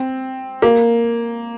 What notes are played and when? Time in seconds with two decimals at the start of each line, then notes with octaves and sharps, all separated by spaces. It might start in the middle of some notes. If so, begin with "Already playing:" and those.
Already playing: C4
0.62 A#3